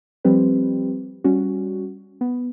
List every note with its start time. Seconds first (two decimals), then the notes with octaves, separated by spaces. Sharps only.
0.25 F3 G3 C4 G4 B4
1.24 G3 C#4 F#4
2.21 B3